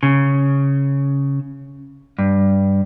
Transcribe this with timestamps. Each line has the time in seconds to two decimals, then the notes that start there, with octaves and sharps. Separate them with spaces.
0.03 C#3
2.19 G2